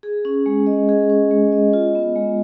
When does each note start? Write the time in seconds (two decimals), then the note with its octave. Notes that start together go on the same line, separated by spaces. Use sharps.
0.03 G#4
0.25 C#4
0.46 G#3
0.67 D#5
0.89 G#4
1.10 C#4
1.31 G#3
1.52 D#5
1.73 F4
1.95 B3
2.16 G#3